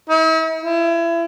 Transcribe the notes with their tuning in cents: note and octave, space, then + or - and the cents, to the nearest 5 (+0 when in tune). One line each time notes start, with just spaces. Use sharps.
E4 -45
E4 +30